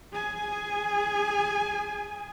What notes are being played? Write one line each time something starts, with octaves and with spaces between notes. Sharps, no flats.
G#4 G#5